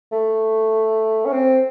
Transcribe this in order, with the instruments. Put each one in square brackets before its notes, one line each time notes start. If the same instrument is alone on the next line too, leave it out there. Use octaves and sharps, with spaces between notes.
[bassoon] A3
C#4
C4